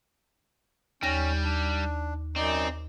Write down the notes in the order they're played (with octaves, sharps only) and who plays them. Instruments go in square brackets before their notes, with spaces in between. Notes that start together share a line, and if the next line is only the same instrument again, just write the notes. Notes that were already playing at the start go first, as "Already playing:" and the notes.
[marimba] D#2 A#6 [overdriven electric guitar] G3 [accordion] C#4
[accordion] D4
[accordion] F#2 D#4 D5 [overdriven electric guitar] C4